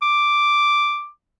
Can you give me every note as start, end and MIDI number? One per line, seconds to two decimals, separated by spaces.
0.02 1.09 86